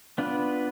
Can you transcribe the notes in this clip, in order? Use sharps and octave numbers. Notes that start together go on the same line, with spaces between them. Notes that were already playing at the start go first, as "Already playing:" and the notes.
B3 D4 F4 B4